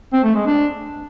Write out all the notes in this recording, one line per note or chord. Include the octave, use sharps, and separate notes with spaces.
C4
A3
G#3
D4